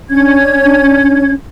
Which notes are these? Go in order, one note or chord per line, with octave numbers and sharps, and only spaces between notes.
C#4 D4 C#5 G#6